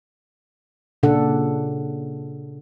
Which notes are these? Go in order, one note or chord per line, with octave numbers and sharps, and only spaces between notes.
A#2 C#3 D4 A4 F#5